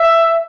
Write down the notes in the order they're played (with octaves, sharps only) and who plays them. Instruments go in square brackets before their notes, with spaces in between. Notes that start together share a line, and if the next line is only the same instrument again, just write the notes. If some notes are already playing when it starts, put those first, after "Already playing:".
Already playing: [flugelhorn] E5